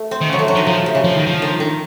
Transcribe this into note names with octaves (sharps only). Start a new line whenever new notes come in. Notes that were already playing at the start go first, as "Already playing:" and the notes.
Already playing: A3
C4
D#3
C#3
F#3
A3
F#3
D#3 F3
C#3 F3
C3
C#3
F3
D#3
F3
D#3
D#3